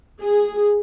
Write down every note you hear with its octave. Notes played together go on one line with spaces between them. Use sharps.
G#4